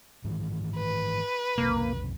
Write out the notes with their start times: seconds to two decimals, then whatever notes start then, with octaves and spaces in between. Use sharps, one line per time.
0.24 G#2 D#3 E3
0.77 B4
1.58 B1 F2 C3 A#3